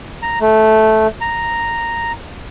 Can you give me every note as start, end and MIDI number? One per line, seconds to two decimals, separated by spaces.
0.22 0.39 82
0.41 1.07 57
1.21 2.12 82